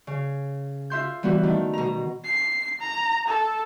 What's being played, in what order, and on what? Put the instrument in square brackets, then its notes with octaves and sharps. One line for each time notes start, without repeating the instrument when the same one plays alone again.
[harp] C#3
F4 E5 C6 G6
E3 G3 B3 F#4 B4
D#3 A3
B2 A#5
[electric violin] C7
A#5
A4